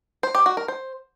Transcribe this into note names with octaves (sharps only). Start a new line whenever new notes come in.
C5
G4
F#4
A#4
C5